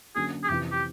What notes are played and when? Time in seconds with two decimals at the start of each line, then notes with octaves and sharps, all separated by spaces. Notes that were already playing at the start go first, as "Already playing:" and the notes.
0.15 D3 F#3 A#3 C#4 F#4 G#4
0.43 G#4
0.49 F2 C3 E3 G4
0.72 G4